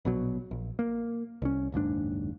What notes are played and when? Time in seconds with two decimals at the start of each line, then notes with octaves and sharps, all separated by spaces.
0.05 A#1 B2 F#3
0.51 A#1
0.79 A#3
1.42 C2 C#4
1.72 F#1 D#2 G#2 D4